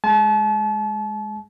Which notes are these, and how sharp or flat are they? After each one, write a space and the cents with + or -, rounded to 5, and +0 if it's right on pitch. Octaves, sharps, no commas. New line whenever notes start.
G#3 +0 A5 -35